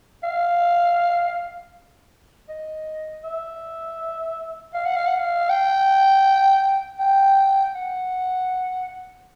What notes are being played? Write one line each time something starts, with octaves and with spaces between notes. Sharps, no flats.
F5
D#5
E5
F5
F#5
F5
F#5
F5
G5
G5
F#5